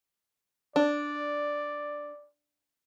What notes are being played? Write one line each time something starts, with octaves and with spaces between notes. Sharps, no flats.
D4 D5